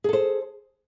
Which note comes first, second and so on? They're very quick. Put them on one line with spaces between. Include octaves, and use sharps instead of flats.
G#4 A4 C5